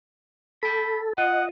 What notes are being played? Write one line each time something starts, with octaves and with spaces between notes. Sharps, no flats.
A4 G5 B5
F4 D#5 F#5